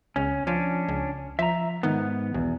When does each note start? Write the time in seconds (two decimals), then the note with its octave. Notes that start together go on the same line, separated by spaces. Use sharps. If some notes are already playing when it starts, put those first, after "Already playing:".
0.16 C#2 C#4
0.47 F3 C#4 D4
0.88 C#2
1.39 F3 E5 A#5
1.83 G#2 D#3 B3
2.34 B1 E2